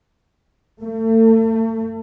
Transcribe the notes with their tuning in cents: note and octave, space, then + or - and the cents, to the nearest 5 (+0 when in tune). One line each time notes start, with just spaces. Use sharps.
A3 +35